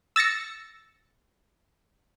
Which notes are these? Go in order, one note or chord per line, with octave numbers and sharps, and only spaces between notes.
E6 A6 A#6 C#7